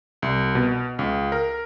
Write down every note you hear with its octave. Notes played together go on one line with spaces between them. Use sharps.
C2
B2
C#2
A#4